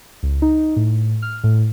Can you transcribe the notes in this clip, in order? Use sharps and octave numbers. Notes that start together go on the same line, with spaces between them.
C#2
D#4
A2
F6
A2